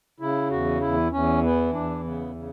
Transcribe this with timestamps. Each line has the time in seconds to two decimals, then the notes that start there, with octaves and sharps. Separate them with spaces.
0.20 C#3 E4
0.51 E2 F#4
0.81 E2 E4
1.12 E2 C#4
1.43 E3 B3
1.73 E2 D4
2.04 C#3 B3
2.35 C#3